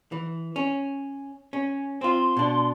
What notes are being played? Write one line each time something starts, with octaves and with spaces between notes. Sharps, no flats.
E3
C#4
C#4
C4 F4 C6
B2 D4